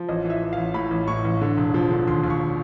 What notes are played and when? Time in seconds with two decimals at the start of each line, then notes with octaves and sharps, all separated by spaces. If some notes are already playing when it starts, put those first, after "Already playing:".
Already playing: F3
0.09 A1 D#5
0.25 E3
0.30 E5
0.41 E3
0.53 A1 F5
0.74 A2 B5
0.91 A1
1.08 A2 C#6
1.24 A1
1.41 D3
1.57 E1
1.74 F3
1.91 D3
2.08 D#2 C6
2.23 D#2
2.30 C#6